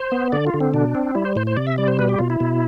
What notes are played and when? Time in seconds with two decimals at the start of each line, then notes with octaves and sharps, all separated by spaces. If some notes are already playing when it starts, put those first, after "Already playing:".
Already playing: C5
0.12 B3
0.32 D3 D5
0.47 F4
0.54 D3
0.60 C4
0.74 B2 D4
0.95 C4
1.15 G3 E4
1.25 C5
1.36 A2 C5
1.47 C5
1.57 C3 D5
1.67 E5
1.78 G3 D5
1.88 C5
1.99 B2 B4
2.09 G4
2.19 B2 F4
2.30 E4
2.40 B2